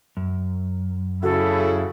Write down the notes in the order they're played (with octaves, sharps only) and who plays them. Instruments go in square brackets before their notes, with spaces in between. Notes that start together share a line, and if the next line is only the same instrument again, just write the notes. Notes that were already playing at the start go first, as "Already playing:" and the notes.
[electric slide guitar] F#2
[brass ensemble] C#3 E4 [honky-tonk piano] F#4 [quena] A4